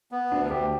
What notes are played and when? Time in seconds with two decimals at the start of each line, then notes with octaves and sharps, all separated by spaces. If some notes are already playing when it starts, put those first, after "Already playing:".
0.12 B3
0.31 D2 D4
0.50 D2 G4